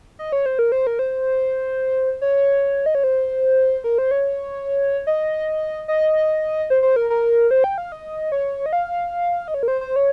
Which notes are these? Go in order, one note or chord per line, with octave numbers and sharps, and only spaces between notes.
D#5
C#5
C5
A#4
C5
A#4
C5
C#5
D#5
C#5
C5
A#4
C5
C#5
D#5
D#5
C5
C5
A#4
A#4
C5
G5
F5
D#5
C#5
D#5
F5
D#5
C#5
A#4
C5
C5
C#5